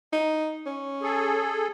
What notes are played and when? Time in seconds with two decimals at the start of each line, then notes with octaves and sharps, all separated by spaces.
0.13 D#4
0.66 C#4
1.02 G#4 A4